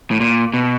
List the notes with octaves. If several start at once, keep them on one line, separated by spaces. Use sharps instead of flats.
A2
A#2
B2